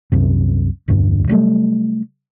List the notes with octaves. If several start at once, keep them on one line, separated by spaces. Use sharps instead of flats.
C2 F#2 C3
E1 D2 G2 D4
C3 F#3 G3 A3